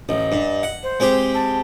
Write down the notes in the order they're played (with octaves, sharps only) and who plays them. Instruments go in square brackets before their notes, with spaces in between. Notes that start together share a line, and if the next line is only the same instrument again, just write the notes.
[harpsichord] A1 [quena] D#5
[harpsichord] G2
F#5
[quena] C5
[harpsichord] G#3 C4 G4
[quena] A5